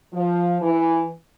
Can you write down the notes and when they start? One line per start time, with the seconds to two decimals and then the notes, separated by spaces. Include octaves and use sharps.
0.13 F3
0.62 E3